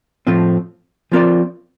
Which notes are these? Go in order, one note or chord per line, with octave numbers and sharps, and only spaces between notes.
A2 F3 A3 C4 F4
F3 C4 F4 A#4 D5